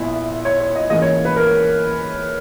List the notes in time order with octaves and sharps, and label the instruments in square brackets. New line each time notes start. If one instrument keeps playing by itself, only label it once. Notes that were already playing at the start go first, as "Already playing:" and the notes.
Already playing: [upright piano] A#1 A#2 B3 E4
C#5
C#5
D#5
G#2 E3 A#3 C#4 D#5
C#5
B4
A#4